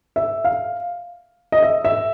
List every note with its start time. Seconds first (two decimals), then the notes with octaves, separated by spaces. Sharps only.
0.16 E5
0.45 F5
1.52 D#5
1.62 E5
1.85 E5